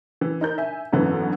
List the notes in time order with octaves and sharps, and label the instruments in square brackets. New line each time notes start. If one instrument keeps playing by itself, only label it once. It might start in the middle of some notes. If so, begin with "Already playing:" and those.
[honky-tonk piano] E3
D#4 A#4 G6
E5 G#5
G#1 F#2 B2 D3 E3 B3